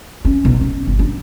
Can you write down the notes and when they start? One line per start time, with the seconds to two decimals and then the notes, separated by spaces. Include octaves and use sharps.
0.25 C#4
0.45 B1
0.61 C#4
0.87 G1
0.99 D4